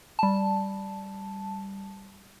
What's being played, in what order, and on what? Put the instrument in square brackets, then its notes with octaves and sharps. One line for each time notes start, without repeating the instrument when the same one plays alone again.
[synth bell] G3 A5